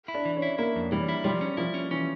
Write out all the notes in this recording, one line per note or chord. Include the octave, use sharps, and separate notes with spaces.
E4
D4
E3
C#4
E4
A#3 E4
F2
E3 G3
E4
F3 G3
C#4
F3 E4
C#4
E3 C#4